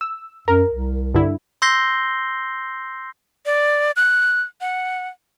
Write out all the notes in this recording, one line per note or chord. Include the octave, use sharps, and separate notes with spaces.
E6
F#2 A#4
C2
G2 D3 E4
C6 E6 G6 A#6 C7 G7
D5
F#6
F#5